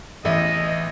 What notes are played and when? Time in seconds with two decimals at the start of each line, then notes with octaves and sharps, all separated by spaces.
0.25 A1 E2 G2 D#5 E5